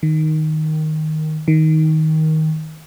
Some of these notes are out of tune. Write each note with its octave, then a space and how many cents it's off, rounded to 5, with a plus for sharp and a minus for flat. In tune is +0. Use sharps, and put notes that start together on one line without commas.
D#3 +0
D#3 +15